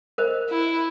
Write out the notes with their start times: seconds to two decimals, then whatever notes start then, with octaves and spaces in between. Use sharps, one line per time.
0.18 A#4 C5 D#5
0.50 E4